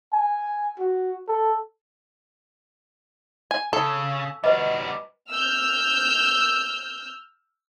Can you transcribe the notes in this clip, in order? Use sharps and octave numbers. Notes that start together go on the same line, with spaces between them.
G#5
F#4
A4
G#5
C#3 A4
G3 F#4 B4 D#5
E6 F6 G6